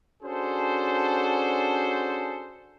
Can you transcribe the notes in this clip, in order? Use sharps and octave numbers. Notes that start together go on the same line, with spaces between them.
C#4 D4 F#4 G#4 A4 C5